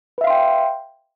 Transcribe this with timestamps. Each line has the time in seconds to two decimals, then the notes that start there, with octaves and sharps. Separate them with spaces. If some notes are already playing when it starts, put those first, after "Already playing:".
0.18 B4
0.21 E5
0.24 F5
0.27 C6
0.30 G5